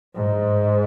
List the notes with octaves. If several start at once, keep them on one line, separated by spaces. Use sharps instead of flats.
G#2